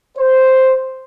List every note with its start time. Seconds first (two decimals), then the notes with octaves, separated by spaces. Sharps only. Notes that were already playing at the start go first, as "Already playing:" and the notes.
0.18 C5